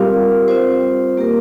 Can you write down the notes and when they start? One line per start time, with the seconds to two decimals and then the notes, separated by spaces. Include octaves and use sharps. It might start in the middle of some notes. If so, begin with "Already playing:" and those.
Already playing: G3 C4 F4 G4 A#4 F5
0.48 C4 F4 C5
1.17 A#3 G4 A#4